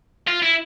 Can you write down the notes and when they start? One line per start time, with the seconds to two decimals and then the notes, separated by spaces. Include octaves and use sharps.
0.27 F4
0.42 E4